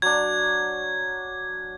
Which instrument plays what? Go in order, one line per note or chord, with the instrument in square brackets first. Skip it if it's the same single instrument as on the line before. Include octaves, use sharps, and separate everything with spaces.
[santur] F#3 D4 [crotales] G#6